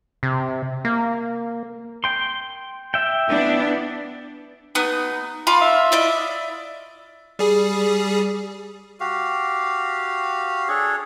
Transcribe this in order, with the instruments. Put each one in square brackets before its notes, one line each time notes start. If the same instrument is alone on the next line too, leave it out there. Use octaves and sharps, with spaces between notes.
[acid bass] C3
A#3
[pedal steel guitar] G5 C6
E5 G5
[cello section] B3 D4 E4
[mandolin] B3 D#6 [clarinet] D#4
[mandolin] F4 F5 D6 [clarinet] B5
[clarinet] E5
[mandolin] E4 D5 D#5
[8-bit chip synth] G3 G#4
[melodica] F#4 G4 F5
D4 G#4 A4 C#5